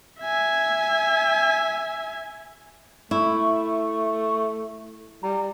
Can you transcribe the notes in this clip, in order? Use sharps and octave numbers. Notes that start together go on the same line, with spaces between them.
E5 G#5
A3 E4 C#6
G3 A#5